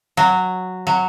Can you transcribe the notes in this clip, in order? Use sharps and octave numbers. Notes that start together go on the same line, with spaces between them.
F#3
F#3